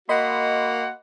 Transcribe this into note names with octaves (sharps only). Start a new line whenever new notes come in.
A#3 F#4 D#5 F#5 B5 C6